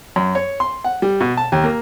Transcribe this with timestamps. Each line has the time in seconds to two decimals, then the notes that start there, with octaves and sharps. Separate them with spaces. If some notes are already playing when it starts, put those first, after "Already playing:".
0.16 F#2
0.35 C#5
0.60 C6
0.84 F#5
1.02 G3
1.21 B2
1.37 A5
1.52 D#2
1.64 A#3